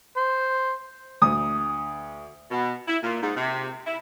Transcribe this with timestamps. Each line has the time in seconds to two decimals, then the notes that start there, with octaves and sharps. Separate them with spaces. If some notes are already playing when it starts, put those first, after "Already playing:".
0.17 C5
1.22 D2 D#6
2.50 B2
2.87 E4
3.03 A#2
3.22 G#2
3.37 C3
3.86 E4